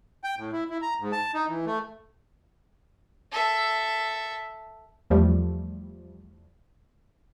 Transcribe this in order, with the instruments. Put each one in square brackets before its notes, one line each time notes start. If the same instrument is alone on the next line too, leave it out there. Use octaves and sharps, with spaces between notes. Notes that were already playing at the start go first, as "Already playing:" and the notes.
[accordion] G5
A2
E4
E4
A#5
G#2
A5
D#4
E3
A3
[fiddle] A4 E5
[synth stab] E2 F3 G3 A3